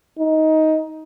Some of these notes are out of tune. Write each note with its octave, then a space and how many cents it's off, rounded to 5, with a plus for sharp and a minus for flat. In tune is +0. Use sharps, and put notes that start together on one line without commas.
D#4 +15